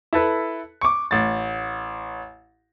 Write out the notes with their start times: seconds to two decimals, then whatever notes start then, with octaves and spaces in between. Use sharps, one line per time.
0.13 E4 A4 B4
0.81 C#6 D6
1.11 A1 A6